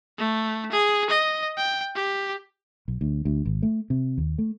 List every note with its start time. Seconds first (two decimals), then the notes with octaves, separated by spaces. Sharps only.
0.18 A3
0.72 G#4
1.10 D#5
1.57 G5
1.95 G4
2.88 B1
3.01 D2
3.25 D2
3.45 G#1
3.63 A3
3.90 C3
4.18 D#2
4.38 A3